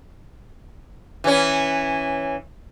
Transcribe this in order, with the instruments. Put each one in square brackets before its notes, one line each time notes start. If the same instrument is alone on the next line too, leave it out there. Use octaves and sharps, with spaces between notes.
[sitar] E3 C#4